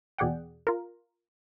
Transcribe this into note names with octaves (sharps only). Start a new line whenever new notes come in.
E2 B2 G#4 D5 F#5 G5
F4 A#4